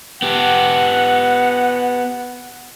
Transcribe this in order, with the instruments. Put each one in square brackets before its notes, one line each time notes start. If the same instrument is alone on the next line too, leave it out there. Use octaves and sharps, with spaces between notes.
[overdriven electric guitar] B3 G4 [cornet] F#5